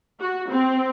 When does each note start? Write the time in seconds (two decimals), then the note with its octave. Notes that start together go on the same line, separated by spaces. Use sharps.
0.20 F#4
0.50 C4